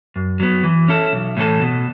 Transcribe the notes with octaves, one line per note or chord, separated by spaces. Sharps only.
F#2
F#3 B3
E3
C#4 E4 A4
B1
A2 E3 C#4 A4
B2